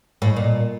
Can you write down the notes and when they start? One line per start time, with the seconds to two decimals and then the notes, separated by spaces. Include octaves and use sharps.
0.22 A2
0.36 A#2